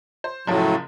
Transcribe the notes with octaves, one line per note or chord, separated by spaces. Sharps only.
C5
F#1 A2 F3 F#3 C#4